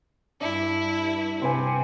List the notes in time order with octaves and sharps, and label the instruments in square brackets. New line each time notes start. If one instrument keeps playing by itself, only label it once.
[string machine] G2 [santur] D4 [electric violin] E4
[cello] C3 [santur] C4 B4 G#5